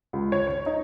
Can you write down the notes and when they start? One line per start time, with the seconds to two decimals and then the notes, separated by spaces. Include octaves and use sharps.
0.13 C#2
0.32 C#5
0.47 C#5
0.66 D#4